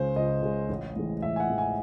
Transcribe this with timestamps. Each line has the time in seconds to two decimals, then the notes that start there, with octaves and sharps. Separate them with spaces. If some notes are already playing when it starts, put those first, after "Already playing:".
Already playing: C#2 C#3 G#3 C5
0.16 C#2 D#5
0.42 C#3 G#3
0.69 A1
0.96 A2 E3 G#3
1.22 A1 E5
1.36 G#5
1.40 F#5
1.49 A2 E3 G#3
1.58 G#5